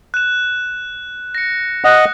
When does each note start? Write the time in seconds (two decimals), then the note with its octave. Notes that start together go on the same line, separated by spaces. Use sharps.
0.14 F#6 E7
1.35 A#6 C#7
1.84 D#5 F#5 D#6 F#6